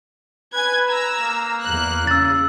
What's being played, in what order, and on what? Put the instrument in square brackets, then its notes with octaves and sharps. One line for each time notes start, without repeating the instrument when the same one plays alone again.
[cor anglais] B4 [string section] G#5 G#6
[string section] A#5 E6
[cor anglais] A#3
[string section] E2 F#6
[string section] C#3 [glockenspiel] E6 A6